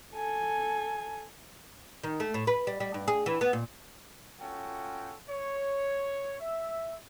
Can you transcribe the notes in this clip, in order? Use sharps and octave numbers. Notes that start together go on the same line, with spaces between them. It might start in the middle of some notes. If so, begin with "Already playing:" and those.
A4 G#5
D#3
A3
A2
B4
G3
G3
G2
G#4
E3
B3
A#2
C#4 F4 F#4 A4 G5
C#5
E5